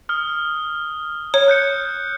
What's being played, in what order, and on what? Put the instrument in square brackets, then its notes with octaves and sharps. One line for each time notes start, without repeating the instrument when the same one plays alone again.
[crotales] D#6 F6
[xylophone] C#5
[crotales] F#6 G6 C#7